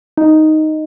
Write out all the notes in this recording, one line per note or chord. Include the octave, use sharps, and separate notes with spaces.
D#4